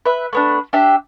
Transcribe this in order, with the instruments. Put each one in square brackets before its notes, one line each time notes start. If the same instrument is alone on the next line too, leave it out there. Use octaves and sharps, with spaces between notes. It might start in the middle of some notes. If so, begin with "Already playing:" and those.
[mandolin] B4 E5
A3 B3 D4
D4 G4 E5